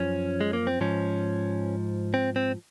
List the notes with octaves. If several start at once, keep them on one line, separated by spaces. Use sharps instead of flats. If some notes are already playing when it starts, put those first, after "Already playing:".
Already playing: F#2 F3 C#4
G#3
A#3
C4
G#2 F3 C#4
C4
C4